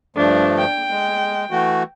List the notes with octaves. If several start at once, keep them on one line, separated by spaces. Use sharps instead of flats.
G2 F3 A3 D4
G5
G#3
E3 A3 F#4